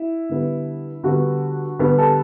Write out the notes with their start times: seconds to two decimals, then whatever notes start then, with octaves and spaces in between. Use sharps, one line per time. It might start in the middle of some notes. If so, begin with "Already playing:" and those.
Already playing: E4
0.29 D3 G3 B3
1.04 D3 G3 B3 F#4
1.79 D3 G3 B3 G4
1.98 A4